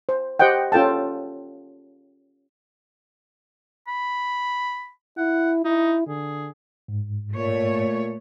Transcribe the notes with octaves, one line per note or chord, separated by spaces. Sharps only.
C5
G4 C5 D#5 F#5 G5
C#4 F4 A4 G5 A5
B5
E4 F#5
D#4 E4
D3 G#4
G#2
A#2 A3 C#5